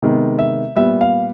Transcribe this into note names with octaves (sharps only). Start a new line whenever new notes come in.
C3 D#3 G#3 B3
E5
A#2 G3 B3 E5
F5